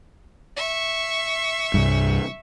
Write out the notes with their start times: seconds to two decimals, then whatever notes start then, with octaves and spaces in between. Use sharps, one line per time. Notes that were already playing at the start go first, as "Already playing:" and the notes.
0.57 E5 C#6
1.74 C2 G2